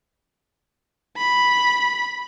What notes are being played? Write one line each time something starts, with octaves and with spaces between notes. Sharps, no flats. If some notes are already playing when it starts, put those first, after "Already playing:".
B5